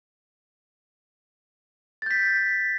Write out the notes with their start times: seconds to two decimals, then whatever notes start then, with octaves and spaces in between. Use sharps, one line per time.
2.02 A6
2.06 G6
2.11 B6